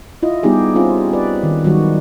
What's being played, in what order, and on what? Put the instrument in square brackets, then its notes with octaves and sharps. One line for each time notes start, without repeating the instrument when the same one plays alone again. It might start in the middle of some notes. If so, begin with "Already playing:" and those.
[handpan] E4 F4 D#5
G3 B3 D#4 G4 G#4
C4 C#4 F4 G#4
B4 D5
D#3
D#3 F#3 G3 F#4